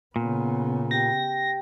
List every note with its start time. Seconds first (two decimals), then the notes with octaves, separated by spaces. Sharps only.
0.16 A#2 C#3 B3
0.91 G4 G5 A#6